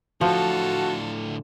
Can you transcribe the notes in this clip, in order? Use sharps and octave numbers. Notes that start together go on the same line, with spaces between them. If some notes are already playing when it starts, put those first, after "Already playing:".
A2 D3 F3 F4 F#4 A4